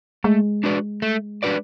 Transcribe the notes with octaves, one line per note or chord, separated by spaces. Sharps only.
G#3 A3
D4 F#4 B4 D5
A3
D4 F#4 B4 D5